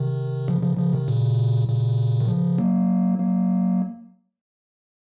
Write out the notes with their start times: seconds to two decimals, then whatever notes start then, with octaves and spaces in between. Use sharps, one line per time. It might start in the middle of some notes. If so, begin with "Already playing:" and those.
Already playing: C3 D#3
0.48 C#3 F3
0.62 C#3 F3
0.77 C#3 F3
0.93 C3 D#3
1.08 A#2 C#3
1.68 A#2 C#3
2.21 D#3
2.28 C#3 F3
2.58 F#3 A#3
3.19 F#3 A#3